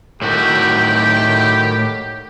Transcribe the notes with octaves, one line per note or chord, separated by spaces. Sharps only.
A2 D#3 F#3 F#4 G4 G5